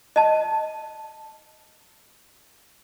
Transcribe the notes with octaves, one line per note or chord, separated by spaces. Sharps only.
D#5 A5